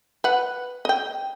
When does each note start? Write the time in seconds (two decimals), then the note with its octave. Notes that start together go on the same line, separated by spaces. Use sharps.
0.24 B4 F#5
0.85 D#5 G5